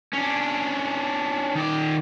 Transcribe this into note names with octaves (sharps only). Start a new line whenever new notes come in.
C#4 D4
D#3 D5